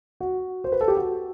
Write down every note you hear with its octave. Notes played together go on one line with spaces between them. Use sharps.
F#4
C5
B4
A4
G4
F#4